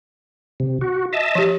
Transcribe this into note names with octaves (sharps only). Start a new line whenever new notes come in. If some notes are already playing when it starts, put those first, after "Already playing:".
C3
F#4
D#5 E5 A5
F3 G4